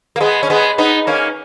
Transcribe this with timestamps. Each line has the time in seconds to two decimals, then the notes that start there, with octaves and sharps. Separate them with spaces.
0.16 A#3
0.21 G#3 B3
0.43 C#4
0.50 G#3 B3
0.78 B3 D#4
1.07 A#3 C#4